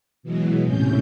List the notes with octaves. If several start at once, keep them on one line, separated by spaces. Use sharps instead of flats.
B2 E3 F#3 G#3
D#2 A2 C3 C#4 G6